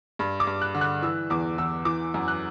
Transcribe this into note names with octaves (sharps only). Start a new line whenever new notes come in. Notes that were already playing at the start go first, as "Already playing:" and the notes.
G2 B5
D6
G2
F#6
D3
F#6
E3 E6
E2 D6
E2 E6
E3 D6
F#2
F#6